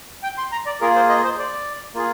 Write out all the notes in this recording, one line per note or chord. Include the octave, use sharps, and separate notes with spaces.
G5
C6
A#5
D5
A#3 F4 G#4 A#4
C5
D#5
C5
D5
A#3 F4 G#4